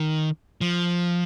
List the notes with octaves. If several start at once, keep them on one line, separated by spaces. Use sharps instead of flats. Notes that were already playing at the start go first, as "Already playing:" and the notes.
Already playing: D#3
F3